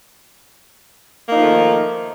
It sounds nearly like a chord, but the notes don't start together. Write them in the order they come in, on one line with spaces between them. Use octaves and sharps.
A#3 D#4 F3 A3 D#3